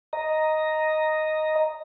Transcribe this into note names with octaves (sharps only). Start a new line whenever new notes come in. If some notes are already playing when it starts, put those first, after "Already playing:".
D#5 A#5